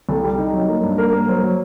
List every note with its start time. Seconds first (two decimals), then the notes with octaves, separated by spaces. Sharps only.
0.09 C2 A4
0.24 G3
0.38 D#4
0.53 F#3
0.69 A#3
0.83 G2
0.98 A#3 A#4
1.13 A#3
1.28 F#3 C5
1.44 F#3